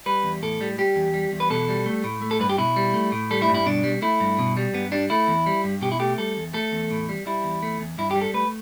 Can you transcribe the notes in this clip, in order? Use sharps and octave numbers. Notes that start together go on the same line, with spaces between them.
G3 B4
E2
A2 A4
G3
G3 G4
E2
G3
E2
B4
B2 A4
G3
A3
A2
A3
A4
G2 B4
G4
B2 E4
G3
A3
A2
G3 A4
E4
G2
E4
B2 D4
G3
A3 E4
G2
B2
G3
G2 B3
G3 D4
A3 E4
E2
G3
G2
B2 G4
E4
A3 G4
G3 A4
E2
A3 A4
E2
A2
G3
G3 E4
E2
A3
E2
G2 E4
G4
G3
A4
A3 B4